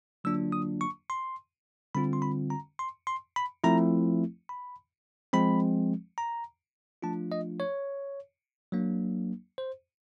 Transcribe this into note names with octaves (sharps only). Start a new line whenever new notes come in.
D3 F#3 A#3 D4 F4 E6
D#6
C#6
C6
D3 G3 C4 F4 B5
C6
B5
A#5
C6
C6
B5
F3 A3 C4 E4 A#5
B5
F3 G#3 C4 B5
A#5
F3 A3 D4 F4 A5
D#5
C#5
F#3 A#3 D4
C5